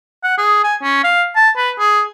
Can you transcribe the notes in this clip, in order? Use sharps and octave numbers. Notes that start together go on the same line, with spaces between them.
F#5
G#4
G#5
C#4
F5
A5
B4
G#4